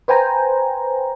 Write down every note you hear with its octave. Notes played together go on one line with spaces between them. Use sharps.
B4 C5 G5 G#5 A#5